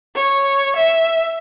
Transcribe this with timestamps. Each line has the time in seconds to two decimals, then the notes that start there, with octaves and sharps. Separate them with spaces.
0.15 C#5
0.76 E5